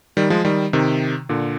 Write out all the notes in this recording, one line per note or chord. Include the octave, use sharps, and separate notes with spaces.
D#3 G3
F3 G#3
D#3 G3
C3 D#3
A#2 D3